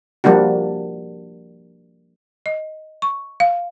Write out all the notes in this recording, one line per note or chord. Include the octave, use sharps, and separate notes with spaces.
F3 G3 A#3 D4 F#4
D#5
C#6
F5